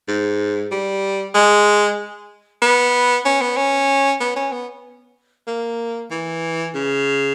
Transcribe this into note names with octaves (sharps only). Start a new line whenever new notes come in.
G#2
G3
G#3
B3
C#4
B3
C#4
B3
C#4
B3
A#3
E3
C#3